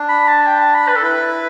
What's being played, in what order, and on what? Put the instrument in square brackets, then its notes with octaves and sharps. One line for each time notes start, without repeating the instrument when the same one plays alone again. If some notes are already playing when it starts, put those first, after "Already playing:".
Already playing: [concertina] D4
[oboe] B5
A5
G5
A5
B5
B4
A4
[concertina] E4 [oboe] B4